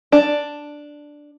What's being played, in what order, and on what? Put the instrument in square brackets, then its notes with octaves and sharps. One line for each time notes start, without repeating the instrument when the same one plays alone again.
[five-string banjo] D4